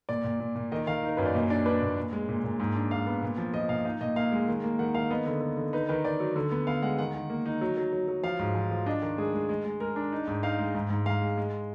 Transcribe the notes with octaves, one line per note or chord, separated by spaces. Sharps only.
A#2 D5
A#2
A#2
A#2
D#3 D#5
D#3 F5
D#4
A#4
F#2 B4
D5
A#2 D#5
D4 D5
D4 B4
A#2
A#2
G#3
A#2
A#2
G#2
D4
G#2 F5
B3
A#2
F3
F3 D#5
A#2 F5
D#4 F5
A#2 D#5
A#2 F5
G#3
D#3
A#3
D#3 F#5
D#3 F5
B3 D#5
D3
B3
D3
D#4 B4
D#3 B4
D#3 D5
F#3
D3
B3
B3 F5
G#3 F#5
D#3 F#5
D#3
A#3
D#4
F#3
F#3
F#3
F#3
F3 F5
G#2
F3
F3
D4 D#5
D#3
G#3 G#4
G#3
G#3
G#3
G#3 A#4
D4
D#4
G#2
D#4 F5
G#3
G#2
G#2
G#2 F5
G#3
G#3